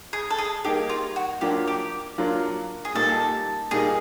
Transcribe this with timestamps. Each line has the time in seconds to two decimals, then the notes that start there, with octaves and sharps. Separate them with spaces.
0.13 G#4
0.30 A4
0.38 G#4
0.64 G3 A#3 D#4 G4 G#4
0.89 F4
1.16 F#4
1.41 F#3 A#3 D4 F4 G4
1.67 G4
2.18 F#3 A#3 D4 F4
2.85 G#4
2.95 A#2 G3 A#3 D#4 A4
3.71 A#2 G3 A#3 D#4 G#4